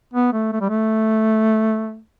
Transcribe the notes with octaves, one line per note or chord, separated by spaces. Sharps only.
B3
A3
A3
G3
A3